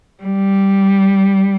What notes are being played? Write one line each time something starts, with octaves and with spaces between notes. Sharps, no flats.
G3